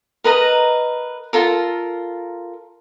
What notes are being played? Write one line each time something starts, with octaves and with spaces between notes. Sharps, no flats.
A#4 B4 D#5 A#5
F4 A4 A#4